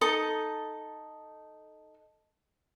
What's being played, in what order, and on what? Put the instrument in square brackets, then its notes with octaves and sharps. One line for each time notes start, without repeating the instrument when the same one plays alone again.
[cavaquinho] D#4 A4 D#6